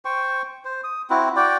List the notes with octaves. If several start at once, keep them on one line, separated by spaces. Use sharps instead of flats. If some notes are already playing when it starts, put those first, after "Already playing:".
C5 G5 C#6
C5
D#6
C4 E4 F#4
F#4 D5 G5